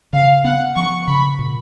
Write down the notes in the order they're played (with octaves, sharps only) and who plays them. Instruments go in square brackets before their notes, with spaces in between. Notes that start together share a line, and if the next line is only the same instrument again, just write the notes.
[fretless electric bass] C#3 [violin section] F5
[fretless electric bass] B3 [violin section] F#5
[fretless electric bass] F3 [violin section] C#6
[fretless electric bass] C#3 [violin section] B5
[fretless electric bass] A#2